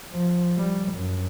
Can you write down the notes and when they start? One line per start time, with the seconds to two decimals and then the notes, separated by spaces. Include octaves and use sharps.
0.11 F3
0.56 G3
0.92 F#2